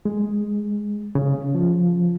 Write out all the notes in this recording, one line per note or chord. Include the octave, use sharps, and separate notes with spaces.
G#3
C#3
F3